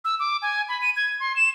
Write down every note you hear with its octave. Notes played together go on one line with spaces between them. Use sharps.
E6
D6
G#5
B5
D#7
G#6
C6
E7